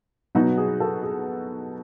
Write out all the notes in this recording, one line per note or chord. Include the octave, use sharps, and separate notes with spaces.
B2 F#3 B3 D#4 F#4
G#4
A4
G#4